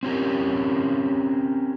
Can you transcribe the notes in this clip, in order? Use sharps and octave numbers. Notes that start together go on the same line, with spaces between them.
C4 C#4 G4 A#4